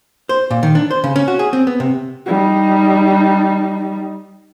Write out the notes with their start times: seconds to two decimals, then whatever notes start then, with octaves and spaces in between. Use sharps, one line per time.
0.29 C5
0.51 A#2
0.63 D#3
0.75 D4
0.91 C5
1.04 C#3
1.16 C#4
1.28 F#4
1.39 G#4
1.53 C4
1.67 B3
1.80 C3
2.26 G3 D#4